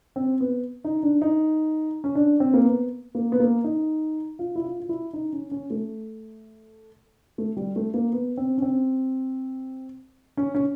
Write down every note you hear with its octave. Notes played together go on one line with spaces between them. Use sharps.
C4
B3
D#4
D4
D#4
C#4
D4
C4
A#3
B3
A#3
B3
A#3
D#4
F4
E4
F4
F4
E4
D#4
C#4
C#4
A3
A3
G3
A3
A#3
B3
C4
C#4
C4
C#4
C#4